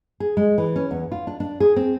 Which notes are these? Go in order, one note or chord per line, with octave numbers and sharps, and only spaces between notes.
G#4
G#3
E3
C#4
E2
F4
D4
D4
G#4
C4